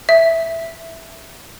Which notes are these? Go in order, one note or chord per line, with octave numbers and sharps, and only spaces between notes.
E5